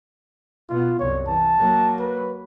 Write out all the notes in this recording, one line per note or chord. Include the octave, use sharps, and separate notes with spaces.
B2 B3 F4
C2 F#2 C#5
E3 A5
F#3 A#3
B4